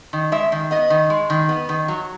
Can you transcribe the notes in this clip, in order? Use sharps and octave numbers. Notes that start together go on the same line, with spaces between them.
D#3
G#3 E5
D#3
B3 D#5
D#3
G#3
D#3
B3
D#3
F#3